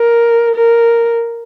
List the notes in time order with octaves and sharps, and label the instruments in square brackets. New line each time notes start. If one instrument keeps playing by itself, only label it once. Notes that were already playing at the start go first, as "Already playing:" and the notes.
Already playing: [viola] A#4
A#4